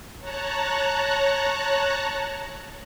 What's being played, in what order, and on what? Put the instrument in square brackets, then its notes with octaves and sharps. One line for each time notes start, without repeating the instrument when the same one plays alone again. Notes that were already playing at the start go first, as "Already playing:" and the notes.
[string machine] C#5 A5 A#5 F#6